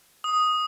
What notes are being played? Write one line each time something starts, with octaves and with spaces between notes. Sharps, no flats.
D#6